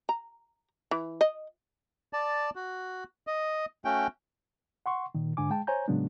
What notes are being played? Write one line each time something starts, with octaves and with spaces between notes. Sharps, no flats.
A#5
E3
D#5
D5 A5
F#4
D#5
A3 C#4 F#4 G5
F#5 C6 C#6
A#2 D#3
G#2 D3 D4 G#5 D6
G#3 G5 A5
C5 C#5 G#5 A#5 G6
A2 C#3 F#3 G#3 B3 D4